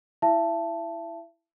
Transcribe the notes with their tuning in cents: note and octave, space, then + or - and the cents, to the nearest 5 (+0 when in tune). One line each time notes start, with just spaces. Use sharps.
E4 +0 E5 +35 A5 +0